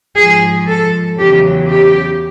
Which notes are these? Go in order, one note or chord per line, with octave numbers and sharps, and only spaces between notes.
G#2 F3 G#4
A4
E2 C#3 F#3 G4
G4